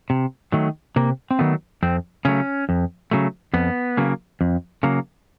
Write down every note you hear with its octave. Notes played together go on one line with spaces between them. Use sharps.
C3
D#3 F#3 A3
C3 A#3
C4
D#3 F#3 A3 B3
F2 C4
C#3 F#3 A3 C#4
F2
C#3 F#3 A3
F2 B3
C#3 F#3 A#3
F2
C#3 F#3 A#3